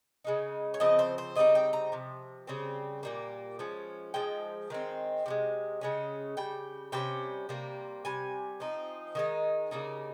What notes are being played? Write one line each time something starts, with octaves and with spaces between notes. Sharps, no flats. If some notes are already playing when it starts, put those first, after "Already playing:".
C#3 G#3 D#4
C#5
C#3 F3 C4 D#5
C5
C5
C#3 G3 C4 D#4 D#5
G5
A#5
C3 F3
C#3 G3 C4
A#2 G3 A#3
F3 G#3 C#4
F3 G#3 D#4 G5
D#3 G#3 C4
C3 F3 G#3
C#3 G#3 C#4
C#3 G3 G5
C3 G3 C#4 G5
C3 G3 A#3
C3 G3 G#5
F3 C4 D#4
D#3 G#3 D#4
C#3 G3 A#3 D#4